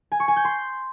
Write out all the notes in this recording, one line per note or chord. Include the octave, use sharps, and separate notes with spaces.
G#5
C#6
G#5
G6
C6